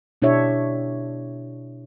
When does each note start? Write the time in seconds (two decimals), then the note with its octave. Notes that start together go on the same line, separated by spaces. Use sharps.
0.22 B2 D4 E4 G4 C#5 E5